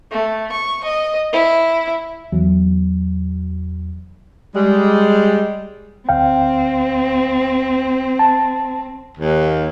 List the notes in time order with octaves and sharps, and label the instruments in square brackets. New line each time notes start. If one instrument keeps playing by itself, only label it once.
[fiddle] A3
C#6
D#5
E4
[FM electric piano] E2 F#3
[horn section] G3 G#3
[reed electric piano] D2 F5 G5 [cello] C4
[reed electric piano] A5
[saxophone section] D#2